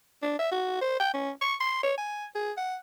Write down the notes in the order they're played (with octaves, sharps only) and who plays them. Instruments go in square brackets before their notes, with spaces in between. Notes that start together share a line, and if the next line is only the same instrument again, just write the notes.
[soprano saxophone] D4
E5
F#4
C5
G5
C#4
C#6
C6
C#5
G#5
G#4
F#5